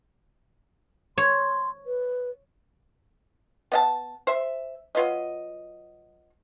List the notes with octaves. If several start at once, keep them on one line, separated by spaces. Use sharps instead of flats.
C#5 C6
B4
B3 D#5 A5
C5 E5
F#3 F4 B4 D#5